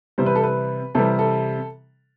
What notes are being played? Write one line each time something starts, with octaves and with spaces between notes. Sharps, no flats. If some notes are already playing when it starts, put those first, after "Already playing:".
C3 E3 G3 C5
B4
A4
B4
C3 E3 G3 A4
A4